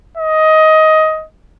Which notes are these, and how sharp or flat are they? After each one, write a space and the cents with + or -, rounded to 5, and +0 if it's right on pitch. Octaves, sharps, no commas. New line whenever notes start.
D#5 +15